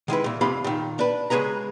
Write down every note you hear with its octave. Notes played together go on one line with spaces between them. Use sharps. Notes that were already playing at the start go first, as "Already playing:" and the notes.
D#3 G#3 E4 B4
A#2 E3
F2 C3 F3 F5 B5 C6
A#2 D#3
D4 B4
C#3 G#3 G#4 B4 A#5